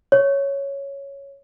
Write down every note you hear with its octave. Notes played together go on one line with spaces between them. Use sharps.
C#5